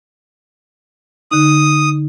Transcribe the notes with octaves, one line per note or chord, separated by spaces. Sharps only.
D3 D#4 D#6